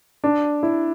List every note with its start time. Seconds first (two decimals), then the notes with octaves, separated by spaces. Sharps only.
0.24 D4
0.63 E4